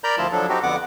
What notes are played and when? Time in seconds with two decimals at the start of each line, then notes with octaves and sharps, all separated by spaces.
0.04 A#4 D5 A#5 B5 G6
0.18 D2 F3 E4 F4 A5
0.32 F3 F#3 D4 A4
0.49 C4 D#4 F#4 G4
0.63 F2 D3 B3 F#5 D6